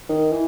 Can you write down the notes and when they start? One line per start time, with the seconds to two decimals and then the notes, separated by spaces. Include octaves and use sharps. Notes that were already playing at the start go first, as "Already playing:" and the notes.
0.09 D#3
0.32 E3